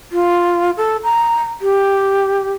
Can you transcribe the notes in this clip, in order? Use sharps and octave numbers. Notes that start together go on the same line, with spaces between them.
F4
A4
A#5
G4